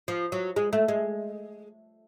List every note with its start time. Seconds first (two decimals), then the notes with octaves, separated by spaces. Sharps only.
0.08 F3
0.32 F#3
0.56 G#3
0.73 A3
0.88 G#3